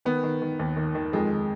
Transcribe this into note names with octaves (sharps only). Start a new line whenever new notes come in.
D#3 B3
D#3
D#3
D#2
D#3
D#3
F2 G#3
D#3